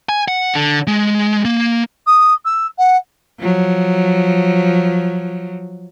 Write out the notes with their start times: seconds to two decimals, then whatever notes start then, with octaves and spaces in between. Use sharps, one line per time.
0.09 G#5
0.28 F#5
0.55 D3
0.87 G#3
1.45 A#3
2.06 D#6
2.45 E6
2.78 F#5
3.39 F3 F#3